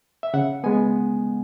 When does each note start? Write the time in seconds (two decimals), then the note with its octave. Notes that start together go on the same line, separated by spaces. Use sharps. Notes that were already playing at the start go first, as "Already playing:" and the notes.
0.23 E5
0.34 C#3 F#5
0.64 G#3 B3 G#5